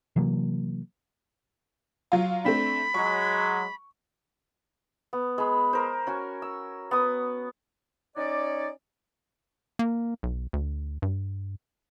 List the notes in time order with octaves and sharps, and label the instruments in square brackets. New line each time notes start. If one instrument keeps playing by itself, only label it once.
[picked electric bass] C3 E3 F#3 A#3
[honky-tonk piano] F#3 F4
[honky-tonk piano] A3 C4 D4 [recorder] B5
[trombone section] F#3 G#3 [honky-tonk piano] C#6
[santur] B3
G#3 B5
A#4 C5
C#4 F#4 G#5
E6
B3 D#6
[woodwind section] C#4 D#4 C#5 D5
[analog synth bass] A#3
B1
D2
G2